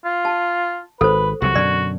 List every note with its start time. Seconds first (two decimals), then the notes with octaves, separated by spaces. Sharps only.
0.05 F4
0.25 A5
1.01 G#1 A4 B4 C5
1.42 C2 C3 F#3 F#4
1.56 F#2 B2 D3 D5